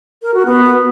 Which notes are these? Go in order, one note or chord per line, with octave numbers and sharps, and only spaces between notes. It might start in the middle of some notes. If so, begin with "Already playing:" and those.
A#4
F#4
B3